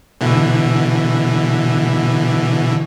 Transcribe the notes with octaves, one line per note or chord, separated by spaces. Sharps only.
B2 D3 E3